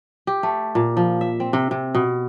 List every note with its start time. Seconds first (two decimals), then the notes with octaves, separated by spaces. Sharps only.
0.27 G4
0.43 A3
0.75 A#2
0.97 F3
1.21 E5
1.40 C4
1.53 C3
1.71 C3
1.95 B2